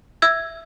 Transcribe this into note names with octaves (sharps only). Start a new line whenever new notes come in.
E5 E6 G#6